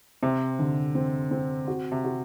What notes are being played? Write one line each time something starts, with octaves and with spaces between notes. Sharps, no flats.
C3 C4
D3
C4
C4
F#4
C3
F#4